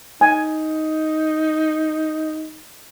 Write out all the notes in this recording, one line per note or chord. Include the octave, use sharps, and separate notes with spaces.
D#4 G#5